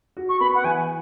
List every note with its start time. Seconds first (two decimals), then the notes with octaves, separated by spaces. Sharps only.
0.17 F#4
0.29 C#6
0.40 B3 B5
0.55 F#5
0.64 E3 G#5